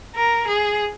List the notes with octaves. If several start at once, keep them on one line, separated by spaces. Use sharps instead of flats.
A#4
G#4